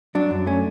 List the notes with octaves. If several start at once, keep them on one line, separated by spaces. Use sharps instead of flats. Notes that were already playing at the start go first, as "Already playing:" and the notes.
F#3 D4
F#2
A3 C#4